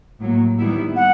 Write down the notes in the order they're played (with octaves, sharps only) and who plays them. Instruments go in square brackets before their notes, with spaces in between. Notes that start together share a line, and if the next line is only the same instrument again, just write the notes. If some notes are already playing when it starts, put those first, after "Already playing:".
[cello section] A2 F#3 A#3
D#3 G3 B3 E4
[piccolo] F#5